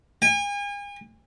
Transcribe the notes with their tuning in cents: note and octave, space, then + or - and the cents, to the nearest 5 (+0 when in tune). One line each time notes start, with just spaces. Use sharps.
G#5 -40